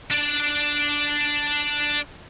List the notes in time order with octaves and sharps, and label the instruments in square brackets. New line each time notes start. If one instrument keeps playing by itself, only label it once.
[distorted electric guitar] D4 D5